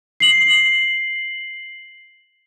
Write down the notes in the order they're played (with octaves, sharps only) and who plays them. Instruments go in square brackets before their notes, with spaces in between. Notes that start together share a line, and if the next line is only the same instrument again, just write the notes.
[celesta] C7 F#7